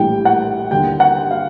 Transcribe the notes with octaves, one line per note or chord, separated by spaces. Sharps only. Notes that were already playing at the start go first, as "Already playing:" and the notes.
Already playing: A#1 A2 E3 G3 G5
F#5
D#2 D3 G3 G5
F#5
F5